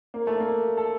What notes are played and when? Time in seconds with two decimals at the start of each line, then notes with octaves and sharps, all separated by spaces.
0.14 A#3
0.27 A3
0.40 A#3
0.77 A4